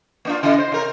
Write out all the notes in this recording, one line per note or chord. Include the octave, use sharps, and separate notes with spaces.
A#3 D4 F4
C#3 E4 D#5
C5
C3 A#4